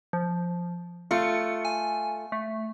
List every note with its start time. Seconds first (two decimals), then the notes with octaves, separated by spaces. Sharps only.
0.13 F3
1.11 A3 F4 C#7
1.65 G#5
2.32 A3